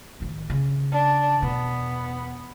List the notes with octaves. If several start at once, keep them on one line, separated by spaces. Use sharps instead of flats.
A1 D#3
C#3
D4
E2 B2 B3